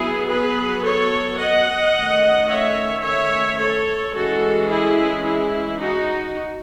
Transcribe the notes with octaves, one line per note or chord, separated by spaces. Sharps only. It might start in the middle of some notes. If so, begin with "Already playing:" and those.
Already playing: F#3 B3 E4 G#4
G#4 B4
A4 C#5
D#5 F#5
D#3 A3 C#4
C#5 E5
C#5 E5
A4 C#5
E3 G#3 C#4 F#4 A4
E4 G#4
E4
D#4 F#4